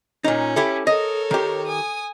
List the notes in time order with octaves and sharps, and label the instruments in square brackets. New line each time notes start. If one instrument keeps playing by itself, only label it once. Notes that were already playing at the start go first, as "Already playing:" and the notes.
[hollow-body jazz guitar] A#2 D#4 [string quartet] C#4
[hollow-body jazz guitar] E4 G4 A4
[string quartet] A4 A#4 C#5 [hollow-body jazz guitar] D#5
[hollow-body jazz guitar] D#3 G4
[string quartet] G#5 D#6